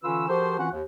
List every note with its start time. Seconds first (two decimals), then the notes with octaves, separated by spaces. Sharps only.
0.03 D3 E3 C#4 F4 B4 E6
0.28 F3 F#4 G4 A4 A#4 C5
0.58 E3 C4 C#4 F4 F#4 F#5
0.71 D#2